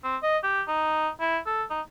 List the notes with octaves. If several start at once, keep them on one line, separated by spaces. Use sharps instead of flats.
C4
D#5
G4
D#4
E4
A4
D#4